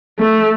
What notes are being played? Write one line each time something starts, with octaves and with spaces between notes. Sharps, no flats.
A3